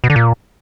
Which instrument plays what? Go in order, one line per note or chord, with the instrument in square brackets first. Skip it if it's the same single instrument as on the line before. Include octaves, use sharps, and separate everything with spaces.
[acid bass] B2
D3
A#2